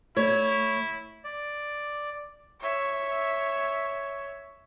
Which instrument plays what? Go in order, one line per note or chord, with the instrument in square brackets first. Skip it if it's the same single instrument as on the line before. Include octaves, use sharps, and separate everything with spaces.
[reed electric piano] A3 [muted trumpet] E4 [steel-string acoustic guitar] C#5
[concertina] D5
[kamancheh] C#5 E5